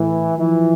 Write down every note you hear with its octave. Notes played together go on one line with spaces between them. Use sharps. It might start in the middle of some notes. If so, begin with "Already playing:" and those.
Already playing: A2 E3
E3 F3